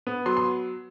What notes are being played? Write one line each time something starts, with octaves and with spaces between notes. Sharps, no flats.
B3
F#3 C6
C6